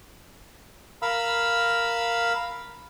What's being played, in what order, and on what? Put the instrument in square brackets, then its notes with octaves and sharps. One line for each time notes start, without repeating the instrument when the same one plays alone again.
[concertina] A#4 F5 B5 E6